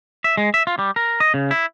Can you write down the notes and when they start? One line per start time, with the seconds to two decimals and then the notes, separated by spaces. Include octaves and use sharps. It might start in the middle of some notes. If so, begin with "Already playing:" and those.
0.24 E5
0.37 G#3
0.54 E5
0.67 F4
0.79 G3
0.96 A#4
1.20 D#5
1.34 C#3
1.51 E4